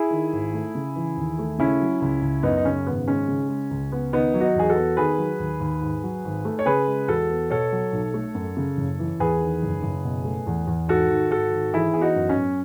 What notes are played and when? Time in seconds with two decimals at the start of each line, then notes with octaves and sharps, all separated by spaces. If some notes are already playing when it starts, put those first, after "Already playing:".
Already playing: E4 G#4
0.11 D#3
0.33 G#1
0.54 A3
0.75 C#3
0.96 E3
1.17 D#2
1.39 A3
1.58 C#3 C#4 E4
1.81 F#3
2.02 C#2
2.22 C#2
2.43 F#2 B3 D#4
2.57 D#4
2.65 C#3 C#4
2.85 G#1 B3
3.08 G#3 C#4
3.28 C#3
3.49 G#3
3.71 C#2
3.92 B3
4.13 D#3 B3 D#4
4.34 F#3
4.40 D#4 F#4
4.55 E2 G#4
4.69 F#4 A4
4.75 B3
4.97 D#3 G#4 B4
5.18 F#3
5.39 D#2
5.60 D#2
5.81 G#2
6.03 F#3
6.24 G#1
6.45 A3
6.59 C#5
6.66 C#3 G#4 B4
6.87 G#3
7.08 E2 F#4 A4
7.30 B3
7.50 B2 A4 C#5
7.72 F#3
7.92 B1
8.14 A3
8.35 F#2
8.57 C#3
8.77 F#1
8.99 E3
9.20 E2 G#4 B4
9.41 D#3
9.62 F#1
9.83 F#1
10.04 B2
10.25 A3
10.46 E2
10.67 E2
10.88 G#2 F#4 A4
11.10 D#3
11.31 G#1 F#4 A4
11.52 G#1
11.73 E3 E4 G#4
11.93 B3 G#4
12.01 D#4 F#4
12.16 F#2
12.29 C#4
12.37 F#2